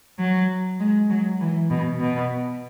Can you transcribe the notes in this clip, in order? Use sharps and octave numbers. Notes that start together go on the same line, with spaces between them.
F#3
G#3
F#3
E3
B2
B2